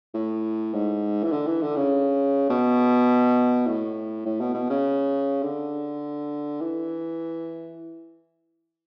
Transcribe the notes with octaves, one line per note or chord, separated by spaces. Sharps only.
A2
G#2
E3
D3
E3
D3
C#3
B2
A2
A2
B2
B2
C#3
D3
E3